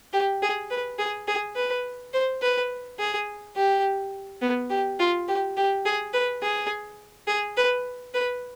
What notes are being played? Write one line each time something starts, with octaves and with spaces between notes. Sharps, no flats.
G4
G#4
B4
G#4
G#4
B4
C5
B4
G#4
G4
B3
G4
F4
G4
G4
G#4
B4
G#4
G#4
B4
B4